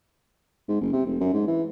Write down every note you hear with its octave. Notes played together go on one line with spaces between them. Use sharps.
G#2
F#1
C3
F1
F#2
G#2
E3